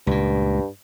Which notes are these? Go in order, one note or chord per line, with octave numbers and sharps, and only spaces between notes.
C#2 G2 A#2